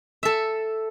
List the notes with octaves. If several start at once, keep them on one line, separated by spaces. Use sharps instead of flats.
A4 E5